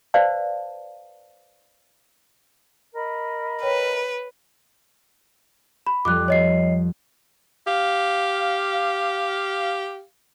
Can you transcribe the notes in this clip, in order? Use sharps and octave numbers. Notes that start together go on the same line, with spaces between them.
B4 C5 D5 F5 A5
A#4 D#5 B5
B4 C#5 G5
B5
F2 F3 G3 D6 F#6
C#5 D#5 C7
G4 F5